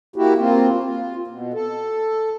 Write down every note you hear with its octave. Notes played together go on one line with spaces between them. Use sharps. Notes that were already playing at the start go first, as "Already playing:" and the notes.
A#3 E4 F#4 G4
A#3 C4 F4
F4
B2
A4